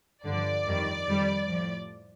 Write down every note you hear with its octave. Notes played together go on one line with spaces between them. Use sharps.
G2 D3 F3 D5
F2 D#3 G3
F2 D#3 G3
A2 F3